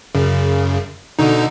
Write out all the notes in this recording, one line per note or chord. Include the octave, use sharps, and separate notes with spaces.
F#2 C#3
B2 D3 D#4